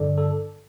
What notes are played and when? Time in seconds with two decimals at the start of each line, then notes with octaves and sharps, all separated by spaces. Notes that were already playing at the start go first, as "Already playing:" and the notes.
Already playing: G2 D3 A4 D5
0.18 A4